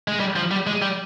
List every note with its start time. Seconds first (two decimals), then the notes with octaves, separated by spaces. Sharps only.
0.08 G#3
0.20 G3
0.36 F3
0.51 G3
0.67 G#3
0.82 G3